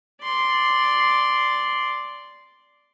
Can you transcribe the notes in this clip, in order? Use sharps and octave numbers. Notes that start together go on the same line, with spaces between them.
D5 C6